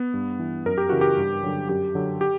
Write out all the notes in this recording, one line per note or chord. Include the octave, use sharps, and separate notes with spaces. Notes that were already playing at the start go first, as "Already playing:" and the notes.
Already playing: B3
G2
E3
F#2 A#4
G4
C#3 E3 F#4
G4
G2
D3 F#3
F#2 G4
D3 F#3
G4